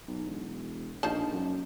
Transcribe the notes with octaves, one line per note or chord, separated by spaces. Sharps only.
B1
E1
A#1 D#4 F4 A5
F#2